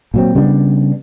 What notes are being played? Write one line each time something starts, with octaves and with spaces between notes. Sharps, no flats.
A#2 F#3 C4
C#3 G3 B3 D4